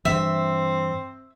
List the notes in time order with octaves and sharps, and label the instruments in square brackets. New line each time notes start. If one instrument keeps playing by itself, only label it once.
[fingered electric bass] G2 E3 [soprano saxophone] C4 [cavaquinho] E5